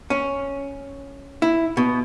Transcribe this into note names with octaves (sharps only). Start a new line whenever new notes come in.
C#4
E4
B2